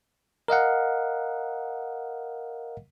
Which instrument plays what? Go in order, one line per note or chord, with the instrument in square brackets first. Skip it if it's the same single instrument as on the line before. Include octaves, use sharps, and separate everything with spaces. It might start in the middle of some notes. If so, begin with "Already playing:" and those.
[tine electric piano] A#4 D#5 F5 F#5